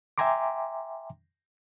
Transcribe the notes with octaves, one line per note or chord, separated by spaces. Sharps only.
E5 G5 G#5 A#5 C6 D6